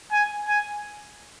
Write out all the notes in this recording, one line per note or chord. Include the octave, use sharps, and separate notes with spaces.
G#5
G#5